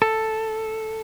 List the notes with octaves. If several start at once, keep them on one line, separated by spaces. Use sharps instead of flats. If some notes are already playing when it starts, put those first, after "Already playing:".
A4